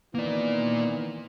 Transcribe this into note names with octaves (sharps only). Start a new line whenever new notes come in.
D#3 E3 A#3 B3 D5